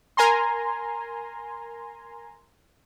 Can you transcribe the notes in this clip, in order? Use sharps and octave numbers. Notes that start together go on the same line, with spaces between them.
A#4 G#5 A#5 C6